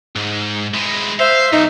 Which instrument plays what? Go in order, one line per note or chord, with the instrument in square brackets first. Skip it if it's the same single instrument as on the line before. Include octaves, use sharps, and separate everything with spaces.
[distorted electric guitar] G#2
G#3 E4
[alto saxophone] C5 [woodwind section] E5 [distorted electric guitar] F5
[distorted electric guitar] B1 [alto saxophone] D#4